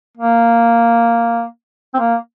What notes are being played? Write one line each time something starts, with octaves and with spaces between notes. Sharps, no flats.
A#3
C4
A#3